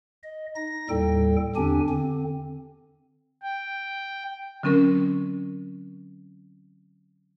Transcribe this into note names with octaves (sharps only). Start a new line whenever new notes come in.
D#5
D#4 A#6
D#2 A2 G3 A4 G5
E2 D3 C4 D4 G4 G#5
D3 C4
G5
D3 F#3 C4 C#4 A#4